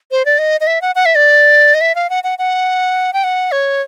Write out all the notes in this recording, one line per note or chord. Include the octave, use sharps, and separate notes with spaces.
C5
D5
D#5
D#5
E5
F#5
F#5
E5
D5
D#5
E5
F5
F#5
F#5
F#5
G5
F#5
C#5